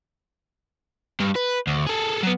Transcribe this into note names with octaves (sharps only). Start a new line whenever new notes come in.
G2
B4
D2
G#4 A4
F#3 B3